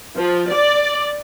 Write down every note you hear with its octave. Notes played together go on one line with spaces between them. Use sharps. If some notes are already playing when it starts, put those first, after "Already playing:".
F3
D5